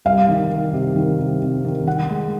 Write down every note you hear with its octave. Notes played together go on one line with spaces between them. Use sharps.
C2 F5
D#3
D#3
C3
D#3
C3
C3
D#3
D#3 F#5
G#3